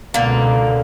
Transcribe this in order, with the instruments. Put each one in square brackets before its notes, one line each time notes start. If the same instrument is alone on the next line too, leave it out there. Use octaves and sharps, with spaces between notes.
[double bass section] C#2 B2 [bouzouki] D3 A#3